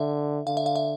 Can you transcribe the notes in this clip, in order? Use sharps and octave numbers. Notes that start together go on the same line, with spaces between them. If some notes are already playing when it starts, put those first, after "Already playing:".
Already playing: D3 E5
D3 F5
E5
F5
E5